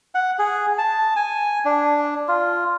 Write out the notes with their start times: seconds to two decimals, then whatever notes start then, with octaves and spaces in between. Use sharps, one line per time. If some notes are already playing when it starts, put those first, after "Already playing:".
0.15 F#5
0.39 G#4
0.78 A5
1.16 G#5
1.65 D4
2.28 F4